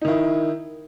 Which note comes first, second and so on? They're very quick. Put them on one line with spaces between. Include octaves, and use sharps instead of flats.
D#4 D#3 E4